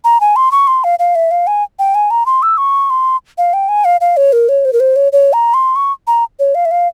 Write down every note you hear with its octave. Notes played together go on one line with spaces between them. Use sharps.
A#5
G#5
C6
C#6
C6
F5
F5
E5
F5
G#5
G5
G#5
A#5
C6
E6
C#6
C6
F5
G5
G#5
F5
F5
C#5
A#4
C#5
C5
A#4
C5
C#5
C#5
A#5
C6
C#6
A#5
C#5
F5
E5
F5